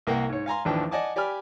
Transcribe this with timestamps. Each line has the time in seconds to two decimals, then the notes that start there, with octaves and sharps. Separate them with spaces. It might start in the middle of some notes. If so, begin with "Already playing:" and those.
0.07 C2 A#3 F#5 G5
0.29 G#2 C#5
0.46 F5 G#5 A#5 C6
0.65 A1 D#2 F3 D4 B4 G5
0.91 D5 D#5 F#5 G#5 A5 D6
1.16 G4 D5 G#5 B5 F6